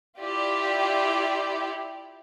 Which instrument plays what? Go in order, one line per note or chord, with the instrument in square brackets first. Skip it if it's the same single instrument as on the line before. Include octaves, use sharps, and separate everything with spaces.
[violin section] E4 F4 G4 D5